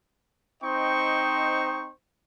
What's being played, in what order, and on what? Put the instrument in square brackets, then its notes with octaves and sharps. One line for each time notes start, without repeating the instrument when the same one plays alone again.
[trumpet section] C4 D#4 C5 D#5 G5 C#6